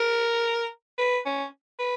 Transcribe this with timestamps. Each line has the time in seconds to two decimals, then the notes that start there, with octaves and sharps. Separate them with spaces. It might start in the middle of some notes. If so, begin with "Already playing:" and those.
Already playing: A#4
0.98 B4
1.26 C#4
1.79 B4